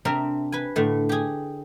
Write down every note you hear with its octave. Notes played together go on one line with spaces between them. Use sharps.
C3 C4 D4 A#4 E5
B4 G#5
A2 D3 A3
G4 G#4